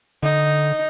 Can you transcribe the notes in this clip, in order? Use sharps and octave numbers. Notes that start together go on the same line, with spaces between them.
D3 D#4